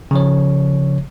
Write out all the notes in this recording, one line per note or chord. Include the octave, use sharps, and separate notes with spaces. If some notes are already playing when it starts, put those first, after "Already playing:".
C#3 F3 C#5